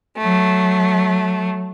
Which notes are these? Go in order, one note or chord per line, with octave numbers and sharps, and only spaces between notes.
F#3 A3